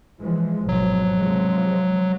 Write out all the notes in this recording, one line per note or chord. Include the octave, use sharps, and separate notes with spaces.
E3 F3 G#3
G#1 B2 F3 F#3
C3 F3 G#3